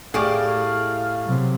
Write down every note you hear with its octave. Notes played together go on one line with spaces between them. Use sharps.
A2 G4 G#4 D5 F5
C3 F#3